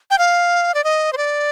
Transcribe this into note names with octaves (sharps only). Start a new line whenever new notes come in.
G5
F5
D5
D#5
C5
D5